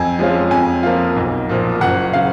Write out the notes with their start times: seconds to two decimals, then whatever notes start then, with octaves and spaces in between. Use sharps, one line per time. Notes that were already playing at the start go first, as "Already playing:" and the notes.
Already playing: F2 G#5
0.19 F3 G#3 C#4 F4
0.51 F2 G#5
0.83 F3 A#3 F4
1.16 B1
1.49 A#2 F3
1.81 F#1 F#5
2.13 C#3 F5